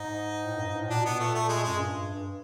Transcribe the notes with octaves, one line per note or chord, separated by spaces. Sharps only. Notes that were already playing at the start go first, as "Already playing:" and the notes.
Already playing: G#2 D#4
A2
G2
G#2
A2
A#2 D4
B2
A#2 B3
A3
A3
G#3
F#2 G#3
G2
G2